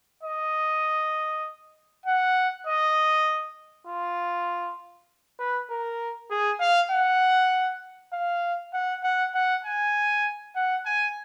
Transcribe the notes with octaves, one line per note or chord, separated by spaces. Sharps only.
D#5
F#5
D#5
F4
B4
A#4
G#4
F5
F#5
F5
F#5
F#5
F#5
G#5
F#5
G#5